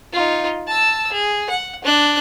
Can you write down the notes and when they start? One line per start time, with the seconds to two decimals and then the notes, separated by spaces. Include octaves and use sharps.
0.13 D#4 F4
0.67 A5 E6
1.12 G#4
1.50 F#5
1.84 D4 F#6